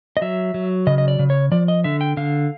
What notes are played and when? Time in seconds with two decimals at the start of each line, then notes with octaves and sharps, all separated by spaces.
0.17 D#5
0.22 F#3 E5
0.54 F#3
0.87 C#3 D#5
0.98 D#5
1.08 D5
1.19 C#3
1.30 C#5
1.52 F3 D5
1.68 D#5
1.84 D3 E5
2.01 G5
2.17 D3 F5